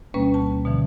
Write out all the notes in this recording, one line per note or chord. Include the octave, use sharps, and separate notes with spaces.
D2 B2 G3 A#3 C#4 B4
A5
B2 D3 E3 F3